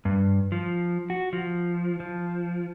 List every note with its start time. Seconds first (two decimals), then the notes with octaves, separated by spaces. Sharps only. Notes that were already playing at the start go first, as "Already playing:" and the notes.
0.05 G2
0.52 F3
1.10 F#4
1.33 F3
2.00 F3